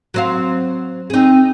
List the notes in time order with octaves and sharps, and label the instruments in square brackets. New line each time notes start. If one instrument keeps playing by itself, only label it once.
[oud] F#3 C4 F5
[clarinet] C4 [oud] D#4 G#4